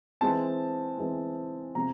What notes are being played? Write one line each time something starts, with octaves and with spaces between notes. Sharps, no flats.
E3 G#3 C4 A5
E3 G#3 C4
C3 F3 G#3 C4 A#5